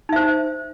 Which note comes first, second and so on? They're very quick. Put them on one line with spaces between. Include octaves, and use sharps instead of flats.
D#4 E5 C5